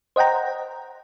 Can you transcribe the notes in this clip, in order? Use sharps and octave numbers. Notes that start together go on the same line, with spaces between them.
C5 D#5 F#5 G5 A#5